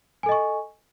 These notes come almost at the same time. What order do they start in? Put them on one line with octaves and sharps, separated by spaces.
G#5 A4 D#5 C#6